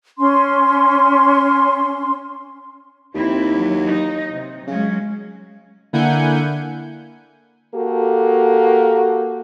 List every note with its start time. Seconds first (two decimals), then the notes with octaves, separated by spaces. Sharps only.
0.17 C#4 C6
3.15 D#2 C4 E4
3.56 F#3
3.86 D#4
4.31 C3
4.67 C#3 F#3 G#3 C#4
5.93 D3 A#3 E4 F#5 G#5 G6
7.75 A#3 F#4 G4 A4